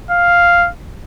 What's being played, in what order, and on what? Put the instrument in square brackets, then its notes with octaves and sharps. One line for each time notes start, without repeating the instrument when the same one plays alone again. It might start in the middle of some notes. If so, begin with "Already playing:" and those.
[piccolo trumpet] F5